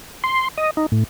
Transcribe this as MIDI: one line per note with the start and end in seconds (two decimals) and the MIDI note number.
0.24 0.48 84
0.58 0.71 75
0.77 0.86 63
0.92 1.04 45